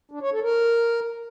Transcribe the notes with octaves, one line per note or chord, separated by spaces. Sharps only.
D4
C#5
A4
A#4